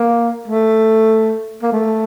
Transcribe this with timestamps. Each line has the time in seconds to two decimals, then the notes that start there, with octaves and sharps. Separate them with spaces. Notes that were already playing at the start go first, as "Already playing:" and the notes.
Already playing: A#3
0.48 A3
1.63 A#3
1.72 A3